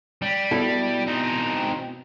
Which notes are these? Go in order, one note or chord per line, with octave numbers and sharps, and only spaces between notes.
G3
B2 E4 A4
C4 D#4